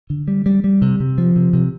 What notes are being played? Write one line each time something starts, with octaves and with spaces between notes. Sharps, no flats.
D3
G3
G3
G3
C3
C3
F3
C3
C3